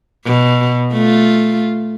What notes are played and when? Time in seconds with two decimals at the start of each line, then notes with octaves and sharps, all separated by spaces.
0.25 B2
0.92 A3 F4